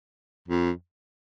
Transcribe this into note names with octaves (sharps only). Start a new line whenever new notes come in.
F2